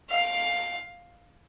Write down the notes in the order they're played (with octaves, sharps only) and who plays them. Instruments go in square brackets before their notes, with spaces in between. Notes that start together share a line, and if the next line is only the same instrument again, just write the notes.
[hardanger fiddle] F5